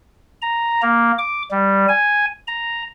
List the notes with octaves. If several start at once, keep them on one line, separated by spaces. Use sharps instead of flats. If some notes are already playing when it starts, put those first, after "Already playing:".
A#5
A#3
D6
G3
G#5
A#5